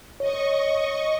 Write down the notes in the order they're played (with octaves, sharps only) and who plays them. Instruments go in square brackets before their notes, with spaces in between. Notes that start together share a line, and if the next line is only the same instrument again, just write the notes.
[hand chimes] C#5 [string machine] D#5 C#6